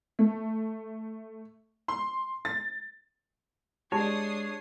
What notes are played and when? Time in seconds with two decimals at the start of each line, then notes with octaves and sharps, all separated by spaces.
0.19 A3
1.88 C6
2.45 A6
3.92 G#3 D4 E4 G4 C#5 A5 D#6 C7